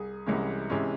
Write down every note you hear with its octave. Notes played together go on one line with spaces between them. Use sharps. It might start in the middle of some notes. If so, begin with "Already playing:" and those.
Already playing: C2 G#4
C2 C3 E3 G#3 C#4
C3 E3 G#3 C#4